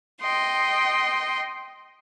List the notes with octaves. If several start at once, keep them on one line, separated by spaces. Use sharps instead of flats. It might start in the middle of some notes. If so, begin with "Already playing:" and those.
D#5 G5 C6